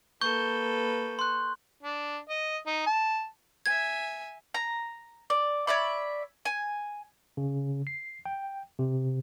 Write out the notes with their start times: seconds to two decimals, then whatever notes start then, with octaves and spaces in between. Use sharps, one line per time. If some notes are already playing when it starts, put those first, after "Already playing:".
0.21 A#3 A4 B4 C#6 G6 G7
1.19 C6 F#6
1.83 D4
2.29 D#5
2.66 D#4
2.87 A5
3.66 E5 G#5 G#6
4.54 A#5
5.30 D5
5.67 C#5 D5 E5 B5
6.45 G#5
7.37 C#3
7.87 C7
8.25 G5
8.79 C3